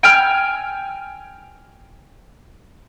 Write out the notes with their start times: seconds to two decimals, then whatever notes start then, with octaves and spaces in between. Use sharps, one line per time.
0.03 G5 G#5 F6